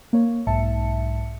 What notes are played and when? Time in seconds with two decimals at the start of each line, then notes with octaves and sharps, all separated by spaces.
0.13 A#3 C#5
0.47 B1 G#2 E5 A5 C#7